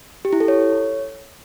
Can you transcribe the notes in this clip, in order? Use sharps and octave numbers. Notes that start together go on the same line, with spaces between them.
G4
E4
A4
C#5